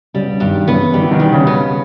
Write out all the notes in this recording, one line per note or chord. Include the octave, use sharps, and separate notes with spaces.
C#3 G3
B2
C#3
G2 B2 D#3
C#3 E3 B3
D#3 G3
E3
B2 D#3
G3
C#3
B2
C#3 B3